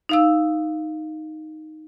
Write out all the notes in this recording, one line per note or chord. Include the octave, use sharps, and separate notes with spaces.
D#4 F5 E6